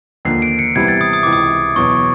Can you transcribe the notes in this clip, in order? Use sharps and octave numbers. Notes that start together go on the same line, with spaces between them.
D#2 D3 F3 A#3 C7
D7
C#7
C2 C3 E3 G3 B3 G#6
A6
D#6
D#6
C#2 C3 E3 D6
D#6
E2 B2 F#3 C#6